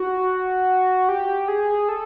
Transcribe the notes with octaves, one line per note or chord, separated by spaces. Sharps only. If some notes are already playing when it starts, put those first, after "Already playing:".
Already playing: F#4
G4
G#4
A4